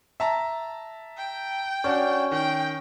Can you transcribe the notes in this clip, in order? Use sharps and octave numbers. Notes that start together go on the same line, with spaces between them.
E5 A5 A#5
G5
C#4 D4 F#4
D#3 G5